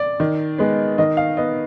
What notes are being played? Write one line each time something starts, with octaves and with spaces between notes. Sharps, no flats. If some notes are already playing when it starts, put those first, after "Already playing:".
Already playing: D5
D#3
G#3 B3
D#3 D#5
F5
B3 D#5